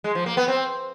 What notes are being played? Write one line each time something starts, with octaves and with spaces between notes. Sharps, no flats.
G#3
F3
A#3
B3
C4